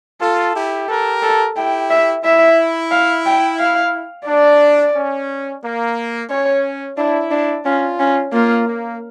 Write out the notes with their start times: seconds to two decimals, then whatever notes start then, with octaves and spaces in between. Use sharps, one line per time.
0.21 F4 A4
0.54 E4 G4
0.88 G4 A4 A#4
1.23 A4
1.56 E4 G4 G5
1.90 E5
2.24 E4 E5
2.91 F5
3.26 G5
3.59 F5
4.27 D4 D5
4.94 C#4
5.63 A#3
6.30 C#4 C#5
6.97 D4 E4
7.31 D4
7.65 C#4 F4
7.99 C#4
8.33 A#3 F4
8.67 A#3